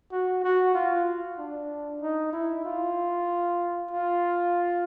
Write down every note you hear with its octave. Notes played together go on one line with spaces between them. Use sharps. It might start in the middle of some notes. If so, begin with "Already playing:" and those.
F#4
F#4
F4
D4
D#4
E4
F4
F4